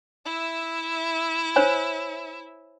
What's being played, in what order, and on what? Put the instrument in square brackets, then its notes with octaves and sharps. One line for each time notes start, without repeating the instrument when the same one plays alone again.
[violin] E4 E5
[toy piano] C5 C#5 G#5